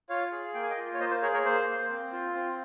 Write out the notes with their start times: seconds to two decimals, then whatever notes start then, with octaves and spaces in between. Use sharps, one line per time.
0.09 F4 C#5 F5
0.32 G#4
0.54 A#3 G5
0.62 G#5
0.70 D#5 G5
0.77 F4
0.94 C#5
1.00 A#3 C5 D#5
1.11 C5
1.22 G#4 A#4 C#5
1.33 A#4 C#5
1.45 A#3 C5
1.67 A#3
1.90 C4
2.13 F4
2.35 C4